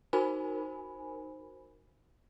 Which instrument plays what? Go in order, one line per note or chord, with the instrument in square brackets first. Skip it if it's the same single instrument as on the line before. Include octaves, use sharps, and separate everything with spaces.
[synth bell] D#4 F#4 A#4 C5 G#5 B5